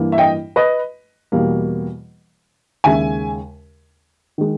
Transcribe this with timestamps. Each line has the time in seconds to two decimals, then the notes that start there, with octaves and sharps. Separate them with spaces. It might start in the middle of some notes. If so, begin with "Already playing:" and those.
Already playing: G2 E3 A#3
0.12 E5
0.18 D#5 G5
0.56 B4 D#5
1.32 E2 B2 G3 A#3
2.84 D#2 C#3 G#3 E5 G#5
4.38 D#3 G#3